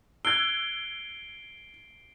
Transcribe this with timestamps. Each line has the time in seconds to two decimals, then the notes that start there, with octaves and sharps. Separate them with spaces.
0.25 E6 F#6 G#6 C7 D7 G7